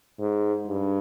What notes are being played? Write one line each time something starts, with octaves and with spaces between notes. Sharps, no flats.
G#2
G2